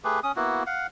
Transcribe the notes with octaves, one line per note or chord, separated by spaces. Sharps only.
A3 G4 G#4 B4
C#4 D#6
A#3 B3 E4 F#4
F5 F#5